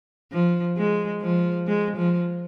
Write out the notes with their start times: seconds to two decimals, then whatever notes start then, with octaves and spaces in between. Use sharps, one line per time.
0.32 F3
0.77 G#3
1.22 F3
1.67 G#3
1.97 F3